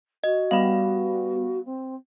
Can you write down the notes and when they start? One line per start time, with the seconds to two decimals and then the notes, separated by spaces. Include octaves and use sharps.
0.24 F#4 D#5
0.51 G3 B3 F5 B5
1.65 C4